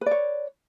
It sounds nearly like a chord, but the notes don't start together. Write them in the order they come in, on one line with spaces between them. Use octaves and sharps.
B4 D5 C#5